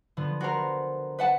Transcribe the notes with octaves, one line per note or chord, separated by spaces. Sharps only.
D3 F3 B3
B3 F#4 A#4 C5
B4 F#5 A5